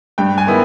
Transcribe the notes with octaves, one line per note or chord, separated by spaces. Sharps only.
G2 G5
G#5
D#3 G#3 B3 E4